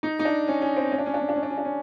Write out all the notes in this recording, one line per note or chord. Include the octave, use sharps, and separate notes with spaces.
D#4
D#4
D4
C#4
C#4
C4
C#4
D4
C#4
D4
C#4
D4
C#4
D4
C#4
D4
C#4